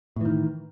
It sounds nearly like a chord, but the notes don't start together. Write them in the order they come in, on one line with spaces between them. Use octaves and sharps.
A2 E3 D#3